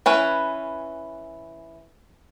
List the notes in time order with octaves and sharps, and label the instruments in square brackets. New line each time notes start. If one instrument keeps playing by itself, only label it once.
[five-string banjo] E3 C#4 B4